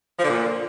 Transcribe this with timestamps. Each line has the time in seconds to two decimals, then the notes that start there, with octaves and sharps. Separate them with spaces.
0.19 F3
0.24 D3
0.29 A#2